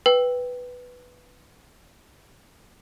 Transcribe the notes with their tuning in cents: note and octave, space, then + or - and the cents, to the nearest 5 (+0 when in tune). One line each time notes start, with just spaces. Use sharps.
B4 +0 G5 +0